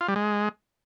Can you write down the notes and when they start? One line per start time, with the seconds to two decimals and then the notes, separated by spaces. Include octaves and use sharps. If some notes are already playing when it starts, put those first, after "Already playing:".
0.01 F4
0.08 G3
0.16 G#3